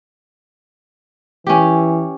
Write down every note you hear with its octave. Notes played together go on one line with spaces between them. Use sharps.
E3 C#4 G4